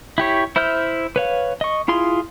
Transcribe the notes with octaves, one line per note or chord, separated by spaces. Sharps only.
E4 G4 C#5
E4 C5 E5 F6 G6
B4 C#5 F5
D#5 C#6
E4 F4 G#4 C6